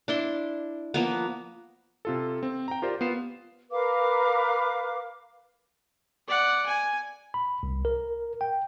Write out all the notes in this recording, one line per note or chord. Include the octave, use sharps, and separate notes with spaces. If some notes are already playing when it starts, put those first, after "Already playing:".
D4 E4 C6
F3 A#3 B3
C3 F4 A4
C4
G5 A#5
F4 G4 A#4 C5 D5
B3 F4 C7 E7
A#4 B4 F5 D6
D5 F#5
G#5
B5
C2
A#4
G5